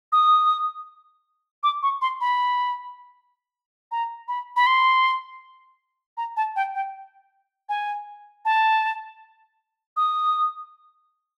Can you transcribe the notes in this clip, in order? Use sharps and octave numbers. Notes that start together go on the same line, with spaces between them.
D#6
D6
C#6
C6
B5
A#5
B5
B5
C6
A#5
A5
G5
G5
G#5
A5
D#6